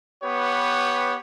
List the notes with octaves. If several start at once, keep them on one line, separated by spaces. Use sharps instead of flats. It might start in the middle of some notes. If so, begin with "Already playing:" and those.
B3 G4 B4 C#5